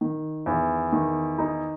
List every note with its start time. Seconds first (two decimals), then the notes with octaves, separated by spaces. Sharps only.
0.01 D#3
0.46 E2
0.92 D#3
1.39 D#4